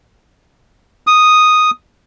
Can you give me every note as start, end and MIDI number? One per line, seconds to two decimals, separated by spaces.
1.07 1.71 87